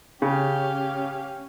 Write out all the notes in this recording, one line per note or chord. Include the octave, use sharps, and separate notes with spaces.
C#3 C#4 G4 F5